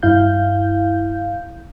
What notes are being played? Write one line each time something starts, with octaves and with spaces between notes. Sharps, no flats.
G2 E4 F5 G6